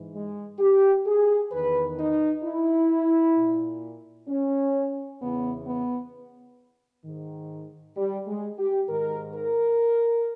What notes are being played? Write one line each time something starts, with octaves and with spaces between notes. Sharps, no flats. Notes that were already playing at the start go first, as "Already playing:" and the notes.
Already playing: G#2 E3
G#3
G4
G#4
E2 D#3 B4
D#4
E4
A#2
C#4
E2 C#3 E3 B3
B3
G#2 D#3
G3
G#3
G4
G#2 D#3 A#4
A#4